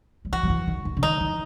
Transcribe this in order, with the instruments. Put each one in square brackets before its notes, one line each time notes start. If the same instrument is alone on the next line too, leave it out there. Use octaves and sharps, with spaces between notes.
[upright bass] F#3
[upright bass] E3 [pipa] F#4
[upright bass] F#3
E3
D#3
D#3
C#3
[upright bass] D#3 [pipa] D#4
[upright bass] E3